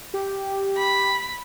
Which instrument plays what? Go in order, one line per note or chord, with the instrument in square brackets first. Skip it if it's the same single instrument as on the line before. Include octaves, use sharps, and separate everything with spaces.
[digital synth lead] G4
[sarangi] B5